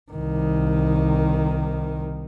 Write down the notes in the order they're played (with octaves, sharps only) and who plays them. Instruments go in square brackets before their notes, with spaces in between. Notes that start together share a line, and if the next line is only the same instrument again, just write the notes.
[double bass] C2 D#3